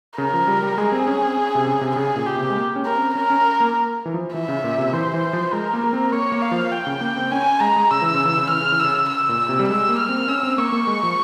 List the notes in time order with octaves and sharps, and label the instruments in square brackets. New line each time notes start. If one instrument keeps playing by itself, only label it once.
[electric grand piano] C#3 [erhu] A#4
[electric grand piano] F3
G3
G3
[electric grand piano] G#3 [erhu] G#4
[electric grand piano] C4
C#4
C4
C#4
C3
C#3
C3
[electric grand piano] C#3 [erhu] G#4
[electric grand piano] A#2
[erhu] G4
[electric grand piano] C3
G#3
A#3
C#4
[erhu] A#4
[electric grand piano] C4
[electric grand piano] C#4 [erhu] A#4
[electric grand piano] C#4
A#3
E3
F3
[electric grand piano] E3 [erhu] E5
[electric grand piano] C#3
A#2
C3
[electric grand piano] E3 [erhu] C5
[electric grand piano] E3
F3
[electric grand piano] G#3 [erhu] A#4
[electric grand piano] A#3
A#3
C4
[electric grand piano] A#3 [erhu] C#5
[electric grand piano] A#3
[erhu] F5
[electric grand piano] F3
[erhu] G5
[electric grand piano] C#3
A#3
C4
[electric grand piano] C#4 [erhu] G#5
[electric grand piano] G#3 [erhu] A#5
[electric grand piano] G#3
[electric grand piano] C#3 [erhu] E6
[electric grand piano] E3
C#3
E3
C#3
[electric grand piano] E3 [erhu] F6
[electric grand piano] C#3
E3
[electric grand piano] C#3 [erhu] E6
[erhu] E6
[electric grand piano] A#2
C3
G3
[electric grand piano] G#3 [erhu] E6
[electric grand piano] A#3
[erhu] F6
[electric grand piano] C4
[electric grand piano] C#4 [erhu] E6
[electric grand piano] C4
[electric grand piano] A#3 [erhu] C#6
[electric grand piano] A#3
G#3
F3